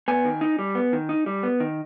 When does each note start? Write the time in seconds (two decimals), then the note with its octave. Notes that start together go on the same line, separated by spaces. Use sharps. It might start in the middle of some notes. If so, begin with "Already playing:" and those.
0.08 B3 G#5
0.25 D#3
0.41 D#4
0.59 G3
0.75 B3
0.93 D#3
1.09 D#4
1.26 G3
1.43 B3
1.60 D#3